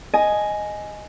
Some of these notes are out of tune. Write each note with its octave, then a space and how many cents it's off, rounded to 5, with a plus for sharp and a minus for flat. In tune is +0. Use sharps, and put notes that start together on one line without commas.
D#5 +0 G#5 +5